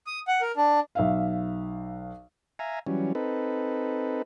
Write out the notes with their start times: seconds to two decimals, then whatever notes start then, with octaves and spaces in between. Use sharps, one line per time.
0.07 D#6
0.28 F#5
0.41 A#4
0.57 D4
0.95 B1 E5 F5
2.59 E5 F5 G#5 A#5
2.87 E3 F#3 G3 C#4
3.15 C4 D#4 A4 B4